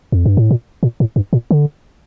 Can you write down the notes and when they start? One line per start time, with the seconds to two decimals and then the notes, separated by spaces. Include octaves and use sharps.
0.12 F2
0.26 G2
0.37 A2
0.51 A#2
0.83 A#2
1.00 A2
1.16 G2
1.33 A#2
1.51 D3